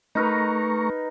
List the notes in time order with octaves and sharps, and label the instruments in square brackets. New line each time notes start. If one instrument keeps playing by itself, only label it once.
[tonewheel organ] A3 A#5 C#6 [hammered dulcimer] D#4 A#4 B4